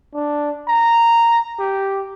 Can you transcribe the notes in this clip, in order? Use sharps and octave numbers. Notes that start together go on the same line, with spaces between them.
D4
A#5
G4